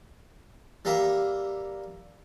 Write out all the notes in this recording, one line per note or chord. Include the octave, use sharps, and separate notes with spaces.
G3 A#3 A#4 E5 F5